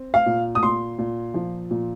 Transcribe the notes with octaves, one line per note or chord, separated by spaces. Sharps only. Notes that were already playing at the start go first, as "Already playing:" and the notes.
Already playing: C4
F5
A#2
D#6
A#2 C6
A#2
F3
A#2